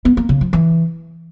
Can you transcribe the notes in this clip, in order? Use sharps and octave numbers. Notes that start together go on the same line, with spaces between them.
B3
A#3
C#3
F3
E3